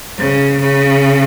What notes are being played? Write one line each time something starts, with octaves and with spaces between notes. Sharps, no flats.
C#3
C#3